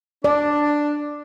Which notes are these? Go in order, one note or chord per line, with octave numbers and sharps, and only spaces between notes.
D4 D5